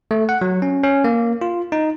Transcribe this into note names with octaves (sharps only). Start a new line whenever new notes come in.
A3
F#5
F#3
C#4
C#4
A#3
F4
D#4